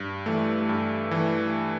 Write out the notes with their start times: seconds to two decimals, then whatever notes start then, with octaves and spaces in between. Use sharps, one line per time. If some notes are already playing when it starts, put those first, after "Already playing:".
Already playing: G2
0.26 E3 A3
0.69 G2
1.11 E3 A3